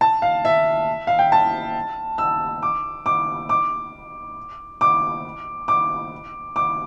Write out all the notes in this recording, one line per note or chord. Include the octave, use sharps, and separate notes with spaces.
A5
F5
E5
F5
G5
A5
E6
D6
D6
D6
D6
D6
D6